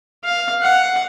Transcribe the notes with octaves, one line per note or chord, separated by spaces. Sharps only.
F5
F#5